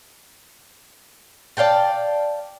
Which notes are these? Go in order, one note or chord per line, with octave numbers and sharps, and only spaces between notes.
D5 F5 G5 A5